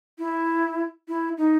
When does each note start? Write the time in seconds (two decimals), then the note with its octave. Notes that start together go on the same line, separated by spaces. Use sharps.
0.19 E4
1.08 E4
1.38 D#4